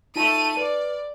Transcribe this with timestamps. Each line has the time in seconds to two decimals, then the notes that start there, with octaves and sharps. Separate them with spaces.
0.16 A3 D#4 F4 A5 D#7
0.57 B4 D5